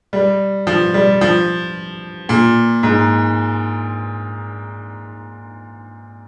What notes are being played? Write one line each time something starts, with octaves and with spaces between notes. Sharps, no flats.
G3
F3
G3
F3
A#2
G#2